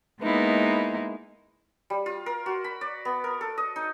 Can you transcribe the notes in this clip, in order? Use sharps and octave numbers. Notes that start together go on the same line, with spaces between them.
G#3 A#3 B3 D#4 E4
G3
F4
A#4
F#4
B5
D5
B3
A#4
A4
D#5
D#4